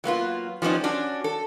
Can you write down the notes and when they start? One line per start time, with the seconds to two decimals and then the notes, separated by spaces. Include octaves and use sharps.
0.04 F#3 A#3 B3 F4
0.62 F3 G3 B3 C#4 D#4
0.84 C#4 D4 F#4
1.24 A4